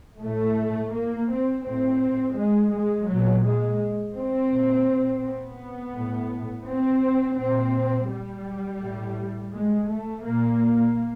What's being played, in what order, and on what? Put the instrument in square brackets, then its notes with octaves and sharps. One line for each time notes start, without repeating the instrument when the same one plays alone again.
[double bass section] A2 A3
A#3
C4
A2 C4
G#3
G#3
A#2 F#3
G#3
C4
A#2
B3
A2
C4
A#2 C4
G3
A2
G#3
A3
A#2 A#3